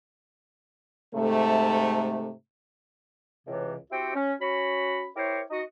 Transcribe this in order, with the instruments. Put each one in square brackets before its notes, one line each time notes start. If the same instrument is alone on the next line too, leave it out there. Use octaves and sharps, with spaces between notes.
[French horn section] G#2 C3 A3
[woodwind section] C#2 A2 C3 E3
C4 E4 F#4 G4 C5 G5
C#4
C#4 F#4 B5
E4 G4 A#4 C5 C#5
D#4 F#4 D#5